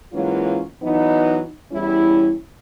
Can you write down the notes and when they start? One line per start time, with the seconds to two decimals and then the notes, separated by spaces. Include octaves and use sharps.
0.12 G#2 E3 F#3 A#3 C#4 F4
0.82 E3 F#3 B3 D#4
1.72 E2 G3 C#4 E4